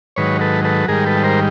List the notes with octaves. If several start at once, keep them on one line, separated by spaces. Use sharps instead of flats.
G#2 D#3 F#3 B4 C#5
A4 B4
A4 B4
G#2 D#3 G3 G#4 A#4
A4 B4
A#4 C5